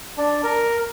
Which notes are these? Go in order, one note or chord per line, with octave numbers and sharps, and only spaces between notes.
D4
A#4